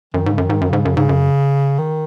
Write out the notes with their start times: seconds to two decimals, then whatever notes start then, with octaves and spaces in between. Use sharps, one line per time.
0.14 F#2 D#3
0.26 G#2
0.31 C#3
0.38 F#2 D#3
0.50 G#2
0.61 F#2
0.69 G#2 C#3
0.85 F#2
0.96 G#2 C#3
1.09 F#2
1.79 D#3